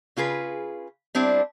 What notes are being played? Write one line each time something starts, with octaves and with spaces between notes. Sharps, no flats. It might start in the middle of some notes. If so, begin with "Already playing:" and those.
C#3 F4 G#4 B4
G3 C4 D4 E4